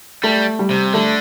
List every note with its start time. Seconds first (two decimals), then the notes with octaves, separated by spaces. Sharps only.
0.24 G3 A3
0.59 G3
0.71 C3
0.94 D3 A3